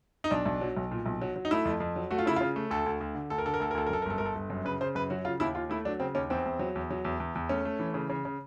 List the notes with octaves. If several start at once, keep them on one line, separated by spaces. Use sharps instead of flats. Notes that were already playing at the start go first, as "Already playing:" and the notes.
D#4
B1 D4
B1
F#3
B1
A#2
B1
F#3
F#3
D#4
A3 E4
F2
F2
F#3
A3 F#4
F4
C#3 E4
C#3 F4
A3
D2 A4
D2
D2
D3
D2 A4
A#4
D3 A4
A#4
D2 A4
A#4
D2 A4
A#4
F#2 A4
A#4
G1 A4
G1 A#4
A4
G1
F#2
C#3 B4
C#3 C5
F#2 B4
F#3 F#4
C#3 F4
D#2 E4
D#2 F4
A3 E4
F#3 D4
C#3 C4
D#2 C#4
E2 C4
E2
F#3
E2
F#3
E2
E2
E2
A3 C#4
A3
E3
C#3
C#3
C#3